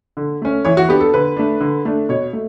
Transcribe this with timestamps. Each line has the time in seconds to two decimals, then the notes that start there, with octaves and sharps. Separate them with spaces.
0.17 D3
0.42 A3 C#4
0.65 E3 C#5
0.77 F#4
0.89 B3 D4 G4
1.01 A4
1.13 D3 B4
1.37 A3 D4
1.61 D3
1.85 A3 D4
2.09 B2 C#5
2.33 A3